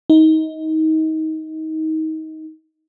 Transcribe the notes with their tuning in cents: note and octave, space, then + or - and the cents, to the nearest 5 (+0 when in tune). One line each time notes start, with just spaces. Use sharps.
D#4 +25